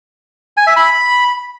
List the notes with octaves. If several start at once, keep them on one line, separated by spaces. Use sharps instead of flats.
G#5
E5
B5